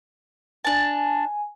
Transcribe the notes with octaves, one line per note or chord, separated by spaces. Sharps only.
D4 G#5 A5